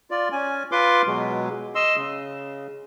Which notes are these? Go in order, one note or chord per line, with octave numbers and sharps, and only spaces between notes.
F4 D5
C#4 G#5
F4 B4 C6 D6
B2 F#3 G#3
D#5 C6 E6
C#3